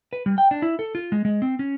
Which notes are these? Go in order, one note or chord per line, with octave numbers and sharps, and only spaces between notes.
B4
G3
G5
D4
E4
A4
F4
G#3
G#3
C4
C#4